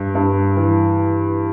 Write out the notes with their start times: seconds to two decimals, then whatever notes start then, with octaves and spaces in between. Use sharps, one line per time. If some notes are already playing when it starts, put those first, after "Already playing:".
Already playing: G2
0.15 G2
0.57 E3